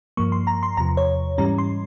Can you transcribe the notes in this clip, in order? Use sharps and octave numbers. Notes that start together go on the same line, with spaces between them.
G2 F3 A#3 C#6
C6
A#5
C6
E2 C3 F3 A#5
C#5
G#2 E3 G3 C#4 A#5
C6